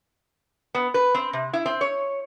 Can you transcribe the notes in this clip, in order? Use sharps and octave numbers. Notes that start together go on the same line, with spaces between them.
B3
B4
C4
C3
E4
C4
C#5